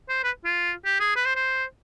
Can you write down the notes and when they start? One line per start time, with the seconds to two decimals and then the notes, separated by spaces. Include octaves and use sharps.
0.09 C5
0.24 B4
0.45 F4
0.85 G4
1.00 G#4
1.16 B4
1.26 C5
1.36 C5